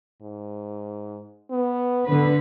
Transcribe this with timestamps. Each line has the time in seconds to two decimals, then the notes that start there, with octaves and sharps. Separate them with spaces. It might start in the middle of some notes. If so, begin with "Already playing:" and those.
0.22 G#2
1.51 B3
2.08 D3 B3 B4